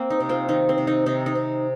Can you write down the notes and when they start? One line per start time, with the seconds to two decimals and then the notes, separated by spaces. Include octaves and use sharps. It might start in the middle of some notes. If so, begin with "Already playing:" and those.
Already playing: A#3 C4
0.10 D#4
0.20 C3
0.29 C4 F4
0.49 D#3 D#4
0.69 C4
0.78 C3
0.87 D#4
1.06 C3 D#4
1.26 D#4
1.35 C3